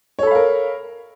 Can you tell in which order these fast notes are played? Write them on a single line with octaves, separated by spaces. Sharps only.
C#5 A4 B5 F5 A#4